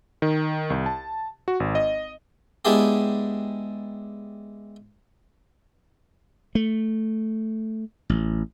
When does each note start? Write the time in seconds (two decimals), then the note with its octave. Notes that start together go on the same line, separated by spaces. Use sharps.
0.22 D#3
0.70 C2
0.86 A5
1.48 F#4
1.60 G#1
1.75 D#5
2.65 G#3 B3 D4 E4 G4 G#4
6.55 A3
8.10 A1